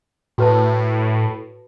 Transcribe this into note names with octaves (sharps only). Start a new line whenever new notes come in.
A2 F#4 B4 A5